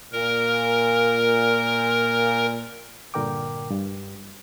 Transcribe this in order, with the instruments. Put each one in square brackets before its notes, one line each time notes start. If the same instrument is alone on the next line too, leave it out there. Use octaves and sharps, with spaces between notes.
[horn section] A#2 [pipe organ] A#4
[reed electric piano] G2 A#2 D3 A#4 G5 D6
G2